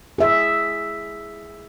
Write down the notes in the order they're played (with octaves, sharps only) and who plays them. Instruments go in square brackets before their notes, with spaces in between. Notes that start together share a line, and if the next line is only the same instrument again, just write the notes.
[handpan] G#4 E5